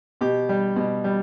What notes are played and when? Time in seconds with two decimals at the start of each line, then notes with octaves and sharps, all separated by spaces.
0.21 B2 G4
0.49 G3
0.76 B2
1.04 G3